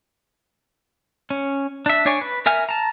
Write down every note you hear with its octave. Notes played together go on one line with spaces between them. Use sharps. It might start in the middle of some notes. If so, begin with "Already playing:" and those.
C#4
D4 E5
D4 C#5 D5 G#5 C#6
B4
A#4 E5 G#5 F6
A5 A#5